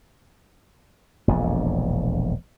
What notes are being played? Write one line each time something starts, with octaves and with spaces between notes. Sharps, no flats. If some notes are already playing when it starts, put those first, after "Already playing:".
E1 A#1 F2